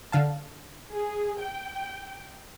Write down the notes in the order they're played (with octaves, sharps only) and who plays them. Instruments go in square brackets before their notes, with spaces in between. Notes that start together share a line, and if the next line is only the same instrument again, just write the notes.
[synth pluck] D3 F5 A5
[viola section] G#4
G5